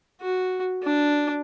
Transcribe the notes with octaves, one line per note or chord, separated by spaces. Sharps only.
F#4
D4